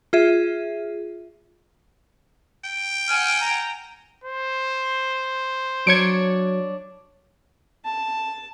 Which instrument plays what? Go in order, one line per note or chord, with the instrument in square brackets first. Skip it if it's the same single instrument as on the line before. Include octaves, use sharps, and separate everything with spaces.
[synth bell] F4 G#4 E5
[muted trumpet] G5
[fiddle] F#5 G#5 [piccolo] F6
[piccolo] A#5
[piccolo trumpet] C5
[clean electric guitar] F#3 [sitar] D4 C#5 [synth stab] G#6 C#7 D7
[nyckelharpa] A5